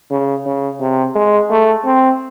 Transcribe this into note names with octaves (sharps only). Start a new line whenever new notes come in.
C#3
C#3
C3
G#3
A3
C4